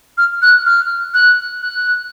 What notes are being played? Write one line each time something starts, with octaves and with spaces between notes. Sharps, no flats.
F6
F#6
F6
F#6
F#6